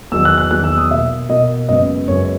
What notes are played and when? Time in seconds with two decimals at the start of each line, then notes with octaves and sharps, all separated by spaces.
0.12 E2 D#3 F#3 B3 E6
0.25 F#6
0.38 F#6
0.51 E2 D#3 F#3 B3 F#6
0.64 E6
0.78 D#6
0.91 B2 A#3 E5
1.29 B2 A#3 D#5
1.69 F#2 C#3 G#3 B3 D#5
2.08 F#2 C#3 G#3 B3 C#5